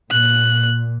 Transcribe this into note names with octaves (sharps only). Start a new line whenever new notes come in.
A#2 F#6